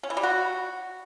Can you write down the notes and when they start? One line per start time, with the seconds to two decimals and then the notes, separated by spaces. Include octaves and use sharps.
0.03 C#4
0.10 E3
0.17 G3
0.23 F#4